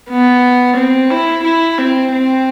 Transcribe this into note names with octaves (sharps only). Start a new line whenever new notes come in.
B3
C4
E4
E4
C4
C4